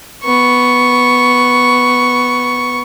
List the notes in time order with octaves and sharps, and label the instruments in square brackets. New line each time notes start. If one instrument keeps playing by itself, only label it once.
[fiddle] B3 C#6